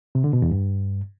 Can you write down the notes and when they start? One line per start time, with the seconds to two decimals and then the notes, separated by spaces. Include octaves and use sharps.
0.15 C3
0.24 D3
0.33 B2
0.42 E2
0.51 G2